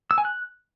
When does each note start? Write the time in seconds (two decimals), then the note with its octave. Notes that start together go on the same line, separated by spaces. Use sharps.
0.11 E6
0.18 G#5
0.25 F#6